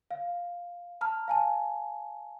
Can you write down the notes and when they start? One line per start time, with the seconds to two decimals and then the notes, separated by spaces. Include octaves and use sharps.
0.11 F5
1.01 A5 A#5 F6
1.28 F5 G#5 A5